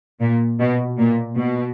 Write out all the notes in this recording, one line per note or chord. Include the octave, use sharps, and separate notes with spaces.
A#2
B2
A#2
B2